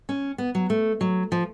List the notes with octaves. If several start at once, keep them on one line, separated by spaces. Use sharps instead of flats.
C#4
B3
F#3
A3
F#3
F3